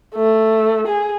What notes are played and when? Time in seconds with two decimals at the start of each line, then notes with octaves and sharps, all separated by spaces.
0.15 A3
0.87 G#4